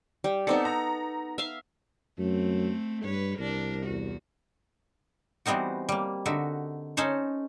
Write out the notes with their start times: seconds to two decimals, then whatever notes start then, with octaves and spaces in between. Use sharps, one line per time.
0.24 G3
0.47 B3 C4 D#4 A4 D5 C#7
0.65 A#5
1.38 E5 F5
2.18 F#2 A3 C4
3.04 G2 B4 C#5
3.39 C2 D4 A#4
3.86 E2 F#4
5.46 E3 G3 B3 C4 D#4 F#4
5.89 G3 A#3
6.26 D3 D#4 F#4 E5
6.97 C#4 D#4 A4 C5 C#5